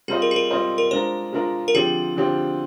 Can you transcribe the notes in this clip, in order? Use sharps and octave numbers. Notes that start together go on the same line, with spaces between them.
G3 C4 F4 G#4 C5 D#5
A#4
G#4
A#4
G3 C4 F4 C5 D#5
A#4
G#3 D4 F4 A#4 C5
G#3 D4 F4 A#4
A#4
D3 F3 C4 G4 G#4
D3 F3 C4 G4